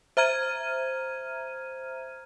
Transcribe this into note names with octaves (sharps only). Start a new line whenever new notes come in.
C5 E5 A#5 F6 G#6 D#7